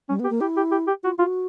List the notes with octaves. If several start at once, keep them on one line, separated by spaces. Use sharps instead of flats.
G3 C#4
B3
G4
A#3
E4 G4
G4
G4
G4
F4 F#4
F4 F#4